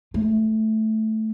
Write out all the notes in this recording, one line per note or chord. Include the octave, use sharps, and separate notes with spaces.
A3